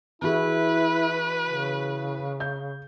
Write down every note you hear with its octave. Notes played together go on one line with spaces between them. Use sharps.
E3 E4 F#4 G#4 B4
C#3
G6